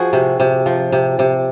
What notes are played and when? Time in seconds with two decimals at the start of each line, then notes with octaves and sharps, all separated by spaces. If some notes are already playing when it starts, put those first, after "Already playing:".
Already playing: F3 F#4 G#4
0.13 C3
0.40 C3
0.66 F3
0.92 C3
1.19 C3